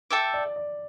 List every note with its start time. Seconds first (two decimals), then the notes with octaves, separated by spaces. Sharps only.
0.10 A4 E5 G5 D6
0.34 D5
0.56 D5